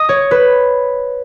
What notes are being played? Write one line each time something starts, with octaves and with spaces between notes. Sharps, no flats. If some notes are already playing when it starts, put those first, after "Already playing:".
Already playing: D#5
C#5
B4